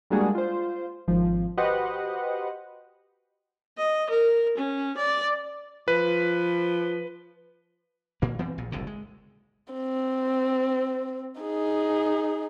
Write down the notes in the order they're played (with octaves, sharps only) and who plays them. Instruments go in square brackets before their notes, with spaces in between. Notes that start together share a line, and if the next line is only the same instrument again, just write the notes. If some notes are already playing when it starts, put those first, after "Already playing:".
[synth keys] G3 G#3 A#3 D4 F#4 G#4
F4 C5
G#1 F3
F#4 G4 B4 C5 D#5 F#5
[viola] D#5
A#4
C#4
D5
[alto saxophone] F3 [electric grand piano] B4
[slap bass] A#2 A#3
E3 B3 C4
A#1 A#2
F#1 C2 A2 D3
G#3
[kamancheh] C4
D#4 G#4